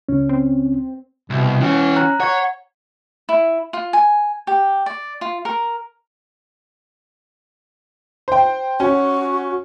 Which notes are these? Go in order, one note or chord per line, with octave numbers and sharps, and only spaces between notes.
C#2 C#4
C4
C2 B2
E3 C#4 F#4
A#5 F#6
C#5 F#5 C#6 G#6
E4
F4
G#5
G4
D5
F4
A#4
C5 G5
C#4 F#4